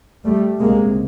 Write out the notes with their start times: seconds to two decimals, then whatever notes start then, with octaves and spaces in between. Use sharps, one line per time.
0.24 G3 A3
0.60 C#2 C3 G#3 A#3